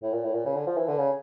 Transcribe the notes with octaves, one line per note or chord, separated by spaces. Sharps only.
A2
A#2
A2
A#2
C#3
D3
F3
E3
D3
C#3